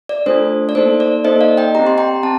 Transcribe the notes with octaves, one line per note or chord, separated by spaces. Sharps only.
D5
A3 D4 F4 A4 C5
D5
A#3 D#4 A4 C5
D5
A#3 D#4 A4 C5 D#5
D5 F5
D#5 G5
C4 G4 A#5
C6
G5 A#5
C4 A5